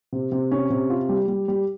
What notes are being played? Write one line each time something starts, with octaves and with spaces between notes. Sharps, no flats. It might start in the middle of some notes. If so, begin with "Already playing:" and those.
C3
C3
C#4
C3
F4
G3
G3
G3